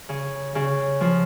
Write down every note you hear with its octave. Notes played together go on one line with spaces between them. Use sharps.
C#3
C#3
F3